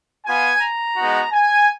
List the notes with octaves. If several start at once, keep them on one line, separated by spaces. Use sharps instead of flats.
B3 F4 G#5
A#5
G#3 B3 D#4 F#4
G#5